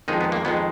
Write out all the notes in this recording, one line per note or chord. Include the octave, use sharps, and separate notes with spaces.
F2 D#3 G#3 D#4
B3
A#3
F2 D#3 G#3 B3